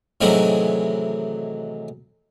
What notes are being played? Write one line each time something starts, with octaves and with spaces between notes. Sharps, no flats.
A2 C3 D#3 E3 F#3 G#3